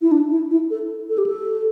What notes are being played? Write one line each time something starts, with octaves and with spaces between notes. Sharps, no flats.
E4
D4
E4
E4
A4
A4
G4
A4